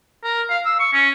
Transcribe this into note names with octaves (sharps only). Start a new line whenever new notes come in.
A#4
F5
E6
C#6
C#4